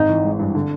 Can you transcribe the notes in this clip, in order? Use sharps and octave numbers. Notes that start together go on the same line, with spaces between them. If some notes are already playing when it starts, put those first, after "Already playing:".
Already playing: G#1 D#4
E3
G#3
G2
D3